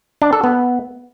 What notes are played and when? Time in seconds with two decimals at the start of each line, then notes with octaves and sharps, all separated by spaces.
0.22 D4
0.33 A4
0.44 B3